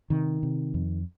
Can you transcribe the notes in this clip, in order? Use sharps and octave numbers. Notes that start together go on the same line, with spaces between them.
C3 D#3
C3
F2